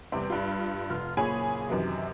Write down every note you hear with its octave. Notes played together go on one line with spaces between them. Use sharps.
E2 C3 G3 C4
G2 G3 F4
F1 F4 F6
F#1 A#2 G#4 C#5 G#5 B5
F#2 C3 D#3 E3 F#3